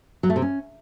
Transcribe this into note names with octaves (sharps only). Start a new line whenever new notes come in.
F#3
A3
C3
C#4